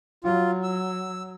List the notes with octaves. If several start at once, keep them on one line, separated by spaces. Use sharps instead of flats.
F#3 F4
E6